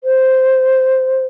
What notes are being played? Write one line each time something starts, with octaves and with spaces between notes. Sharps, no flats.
C5